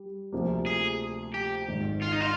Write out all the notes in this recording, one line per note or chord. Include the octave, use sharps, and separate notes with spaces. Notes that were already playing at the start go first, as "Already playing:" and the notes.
Already playing: G3
D2 C3 F3 A#3
G#4
G4
G#1 G#2 D#3
F4
D#4
F4